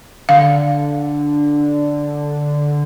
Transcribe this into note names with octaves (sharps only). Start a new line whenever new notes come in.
D3 F5